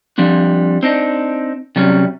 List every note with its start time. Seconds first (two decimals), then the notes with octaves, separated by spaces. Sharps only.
0.18 F3 G3 C4 D4
0.83 C4 D4 D#4
1.76 C3 F#3 G3 C#4